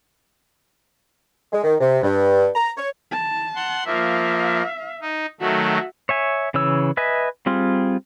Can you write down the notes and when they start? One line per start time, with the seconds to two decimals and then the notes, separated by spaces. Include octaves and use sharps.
1.53 G#3
1.64 D#3
1.80 C3
2.03 G2
2.55 A#5
2.77 C#5
3.12 A5
3.55 F#5 C6
3.85 F3 A#3 E5 F5
5.01 D#4
5.40 D#3 F#3 A3 F#4 E5
6.09 C#5 E5 G#5
6.54 C#3 E3 C#5 E6
6.97 B4 D#5 E5 G#5
7.46 G3 C4 F4 G#4